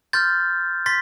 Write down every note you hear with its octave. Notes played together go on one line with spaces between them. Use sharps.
C6 F6 G6 A6
C6 A6 B6